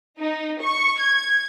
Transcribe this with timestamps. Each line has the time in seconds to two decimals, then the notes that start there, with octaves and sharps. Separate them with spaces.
0.20 D#4
0.62 C#6
1.00 G#6